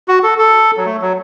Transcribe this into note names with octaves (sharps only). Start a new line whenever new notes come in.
F#4
A4
A4
F#3
A3
F#3